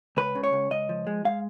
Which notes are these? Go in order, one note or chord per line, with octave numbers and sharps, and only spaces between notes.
C#2 B4
C#3
C#5
C#2
C#2 D#5
F3
G#3
G#3 F5